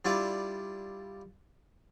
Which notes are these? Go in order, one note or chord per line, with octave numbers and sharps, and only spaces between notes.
G3 D4 E4 F4 D5